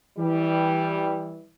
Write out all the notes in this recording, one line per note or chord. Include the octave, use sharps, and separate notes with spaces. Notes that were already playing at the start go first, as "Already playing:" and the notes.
E3 G3